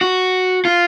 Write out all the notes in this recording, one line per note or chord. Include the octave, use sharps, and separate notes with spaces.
F#4
F4